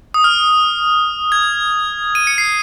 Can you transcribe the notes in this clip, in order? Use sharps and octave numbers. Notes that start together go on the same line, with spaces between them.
D#6
F6
G#6
D#7
C#7
C7